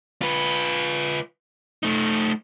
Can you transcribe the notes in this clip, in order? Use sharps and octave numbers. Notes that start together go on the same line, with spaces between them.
F4 B4
A3 D#4